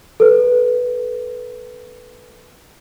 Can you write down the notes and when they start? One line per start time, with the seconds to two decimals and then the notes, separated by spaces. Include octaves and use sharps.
0.20 A4 B4